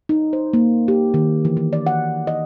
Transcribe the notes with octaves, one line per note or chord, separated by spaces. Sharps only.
D#4
C5
A#3
G4
D#3
E3
E3
D5
F#5
D#5